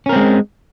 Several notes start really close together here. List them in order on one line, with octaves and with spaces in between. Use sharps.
C#4 A#4 C4 G#3